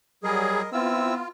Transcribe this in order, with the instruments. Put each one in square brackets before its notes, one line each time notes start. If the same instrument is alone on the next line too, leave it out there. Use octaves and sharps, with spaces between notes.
[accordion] F#3 G3 G#4 [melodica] A#4 D#5
[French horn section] B3 [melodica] C4 E4 E6 [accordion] F4